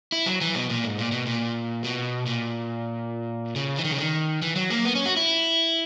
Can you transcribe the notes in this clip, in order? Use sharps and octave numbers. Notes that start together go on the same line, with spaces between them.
E4
F#3
E3
B2
A#2
G#2
A#2
B2
A#2
B2
A#2
C#3
E3
D#3
C#3
D#3
E3
F#3
A#3
B3
C#4
F#4
E4